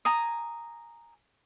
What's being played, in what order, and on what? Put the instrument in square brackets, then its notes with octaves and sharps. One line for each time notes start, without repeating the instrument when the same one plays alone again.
[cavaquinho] G#5 A#5 D#6